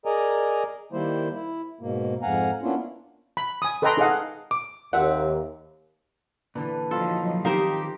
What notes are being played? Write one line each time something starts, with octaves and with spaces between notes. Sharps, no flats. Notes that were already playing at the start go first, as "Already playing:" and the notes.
G#4 A#4 D5 D#5 G#5 A#5
D#3 G3 A#3 E4 C5
E4
G#2 B2 A#3
F2 G#2 F5 F#5 G#5 A#5
A#3 B3 C#4 D4 E4 F4
B5
G#5 D#6
A4 B4 D#5 G5 A#5 C6
D#4 G#4 A4 D#5 F5 F#5
D6
D#2 C4 E5 F#5
A#2 D3 E3 A4 B4
F3 F#3 D#4 F4 A4 A5
D#3 C4 D#4 G4 A#4 C5 F5